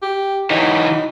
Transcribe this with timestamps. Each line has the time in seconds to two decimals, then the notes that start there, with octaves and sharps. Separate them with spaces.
0.02 G4
0.50 E3 F#3 D#4